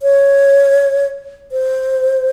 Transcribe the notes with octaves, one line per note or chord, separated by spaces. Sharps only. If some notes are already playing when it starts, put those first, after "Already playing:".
C#5
C5